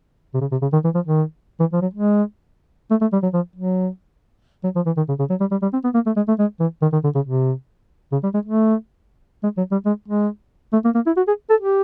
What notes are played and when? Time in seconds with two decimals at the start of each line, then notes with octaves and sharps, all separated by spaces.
0.34 C3
0.41 C#3
0.52 C3
0.62 C#3
0.73 D#3
0.84 E3
0.95 F3
1.06 D#3
1.60 E3
1.73 F3
1.82 F#3
1.93 G#3
2.91 A3
3.01 A3
3.13 G3
3.23 F#3
3.34 F3
3.56 F#3
4.64 F#3
4.76 F3
4.86 E3
4.97 D#3
5.09 C#3
5.19 C#3
5.30 F#3
5.40 G3
5.51 G3
5.62 G3
5.73 C4
5.84 B3
5.94 A#3
6.06 A3
6.16 G#3
6.28 A3
6.39 G#3
6.60 E3
6.82 D#3
6.93 D#3
7.04 D3
7.15 C#3
7.26 C3
8.12 C#3
8.23 G3
8.34 G#3
8.45 A3
9.43 G#3
9.57 F#3
9.72 G3
9.86 G#3
10.08 G#3
10.73 A3
10.85 A#3
10.95 A#3
11.06 E4
11.17 F#4
11.27 G#4
11.50 A4
11.60 G4